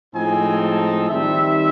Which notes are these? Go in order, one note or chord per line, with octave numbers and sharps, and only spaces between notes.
A2 F3 G#3 C4 D#4 G#5
A5
D#3 G3 C4 D#4 E5